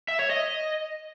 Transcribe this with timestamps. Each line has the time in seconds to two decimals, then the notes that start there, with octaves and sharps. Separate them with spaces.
0.08 E5
0.19 C#5
0.30 D#5